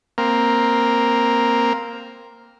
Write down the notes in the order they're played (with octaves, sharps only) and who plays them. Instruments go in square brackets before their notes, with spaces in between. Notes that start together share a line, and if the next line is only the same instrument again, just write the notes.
[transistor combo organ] A#3 C4 A#4